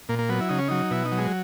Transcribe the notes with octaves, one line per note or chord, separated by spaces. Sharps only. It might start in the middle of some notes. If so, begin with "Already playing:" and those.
A#2 A#3
A#3
F#3 B3
E4
C#3 D#4
C#4
F#3 D#4
B2 E4
D#4
F#3
G#3